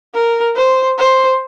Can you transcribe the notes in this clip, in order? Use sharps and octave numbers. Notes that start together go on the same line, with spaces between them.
A#4
C5
C5